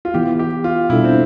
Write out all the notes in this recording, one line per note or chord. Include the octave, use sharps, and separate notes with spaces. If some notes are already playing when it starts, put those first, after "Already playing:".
F4
E3 B3 E4 G4
G4
F4
B2 G3 D4 E4 A4
C4